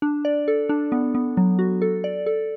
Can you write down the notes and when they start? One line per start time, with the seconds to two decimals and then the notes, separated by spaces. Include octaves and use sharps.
0.02 D4
0.25 D5
0.48 A4
0.69 D4
0.92 B3
1.15 B3
1.37 F#3
1.59 F#4
1.82 A4
2.04 D5
2.26 A4